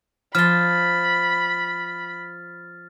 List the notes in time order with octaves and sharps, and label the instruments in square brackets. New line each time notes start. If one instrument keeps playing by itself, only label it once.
[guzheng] F3 C6 [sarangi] B5 [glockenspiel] F6 A6